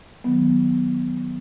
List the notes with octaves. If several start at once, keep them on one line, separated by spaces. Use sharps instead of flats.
D#3 F#3 B3